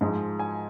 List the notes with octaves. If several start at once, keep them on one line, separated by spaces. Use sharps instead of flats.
G#2 F3 G#3
G#5